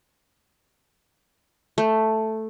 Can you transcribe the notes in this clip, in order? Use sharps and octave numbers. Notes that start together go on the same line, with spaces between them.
A3